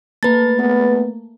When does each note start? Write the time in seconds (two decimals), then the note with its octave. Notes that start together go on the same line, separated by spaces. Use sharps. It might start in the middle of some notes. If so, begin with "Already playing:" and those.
0.23 A3 A#3 B4 A6
0.59 B3